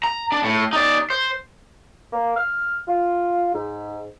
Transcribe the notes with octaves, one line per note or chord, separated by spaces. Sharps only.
A#5
D4
A2
D#4 D5
C5
A#3
F6
F4
G#2